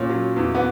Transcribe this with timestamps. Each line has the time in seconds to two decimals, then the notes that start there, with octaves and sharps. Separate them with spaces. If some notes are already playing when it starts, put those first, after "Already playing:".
Already playing: A#2 C#4
0.10 F#3
0.36 E2
0.55 B3